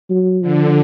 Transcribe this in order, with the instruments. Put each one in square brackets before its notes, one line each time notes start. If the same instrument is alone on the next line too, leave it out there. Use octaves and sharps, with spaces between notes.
[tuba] F#3
[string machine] D3 [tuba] F3